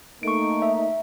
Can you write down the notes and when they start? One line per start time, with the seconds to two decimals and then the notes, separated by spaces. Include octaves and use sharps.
0.23 A3 A#3 D#4 C#6 D7
0.62 E5